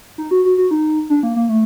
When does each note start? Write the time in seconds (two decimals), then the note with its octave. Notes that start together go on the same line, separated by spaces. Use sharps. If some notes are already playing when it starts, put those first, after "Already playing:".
0.18 D#4
0.31 F#4
0.45 F#4
0.58 F#4
0.71 D#4
1.10 D4
1.23 A#3
1.36 A#3
1.49 A3